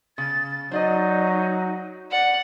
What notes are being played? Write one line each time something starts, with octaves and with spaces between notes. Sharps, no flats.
C#3 A6
F#3 D#4 C5 D5 D#5
D5 F#5